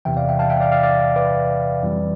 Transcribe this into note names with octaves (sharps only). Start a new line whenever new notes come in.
E2 C3 E3 E5 G5
D5 F5
E5 G5
F5 A5
E5 G5
D5 F5
D5 F5
D5 F5
B4 D5
F2 E3 G3